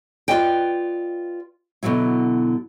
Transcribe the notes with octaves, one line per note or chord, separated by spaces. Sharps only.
F4 G4 B4 D5 D#5 G5
B2 D3 F3 F#3 E4